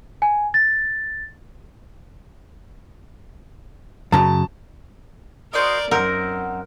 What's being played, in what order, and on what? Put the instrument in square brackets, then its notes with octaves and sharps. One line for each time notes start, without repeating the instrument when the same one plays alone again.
[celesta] G#5
A6
[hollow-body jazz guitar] F#2 C#3 A#5 [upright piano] A5
[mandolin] F#4 C5 D#5 [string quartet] A#4 D5
[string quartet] F#2 [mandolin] C4 D#4 F#5 [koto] A#4